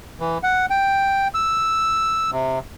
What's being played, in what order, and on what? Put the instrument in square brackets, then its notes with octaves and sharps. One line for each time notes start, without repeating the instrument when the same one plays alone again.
[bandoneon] E3
F#5
G5
E6
C3